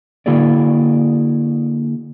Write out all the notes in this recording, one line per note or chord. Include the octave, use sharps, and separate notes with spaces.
D3 A#3 E4 F#4 G#4 D5